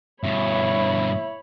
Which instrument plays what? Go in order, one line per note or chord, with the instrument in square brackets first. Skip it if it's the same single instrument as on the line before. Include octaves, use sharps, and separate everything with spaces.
[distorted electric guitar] G2 B2 [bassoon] E4 [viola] C#5 B5